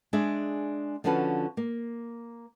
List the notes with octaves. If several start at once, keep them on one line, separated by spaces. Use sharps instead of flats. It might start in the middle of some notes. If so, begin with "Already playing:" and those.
G#3 D4 G#4 D5 E5
D3 F3 C#4 F#4 B4 A5
A#3